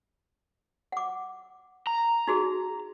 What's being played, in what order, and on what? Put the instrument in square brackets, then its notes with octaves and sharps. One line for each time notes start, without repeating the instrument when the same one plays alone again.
[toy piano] F#5 D6
[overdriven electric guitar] A#5
[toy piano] D#4 F#4 G#4